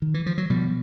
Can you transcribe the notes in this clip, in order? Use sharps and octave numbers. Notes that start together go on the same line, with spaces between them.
D#3
E3
F3
F#3
B2 F3 G3